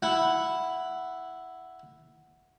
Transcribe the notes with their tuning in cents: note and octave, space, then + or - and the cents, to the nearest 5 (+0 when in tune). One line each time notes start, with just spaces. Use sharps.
E4 +0 F#5 +0